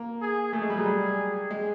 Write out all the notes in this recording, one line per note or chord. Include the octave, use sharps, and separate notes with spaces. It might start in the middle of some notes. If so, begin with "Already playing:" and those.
Already playing: A#3
G#4
A3 G#4
G#3
G3
F#3
G3
G#3